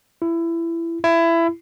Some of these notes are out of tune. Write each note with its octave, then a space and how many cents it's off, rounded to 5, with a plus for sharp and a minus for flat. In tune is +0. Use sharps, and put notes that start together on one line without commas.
E4 +20
E4 +20